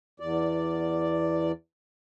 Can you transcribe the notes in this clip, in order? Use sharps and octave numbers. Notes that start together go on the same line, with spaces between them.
E2 D5